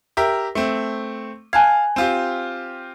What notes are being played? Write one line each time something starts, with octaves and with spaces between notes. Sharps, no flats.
G4 A#4 E5
A3 C4
F5 G#5 A5 F#6 G#6
C4 F4 G4